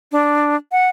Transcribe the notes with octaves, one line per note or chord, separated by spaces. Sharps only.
D4
F#5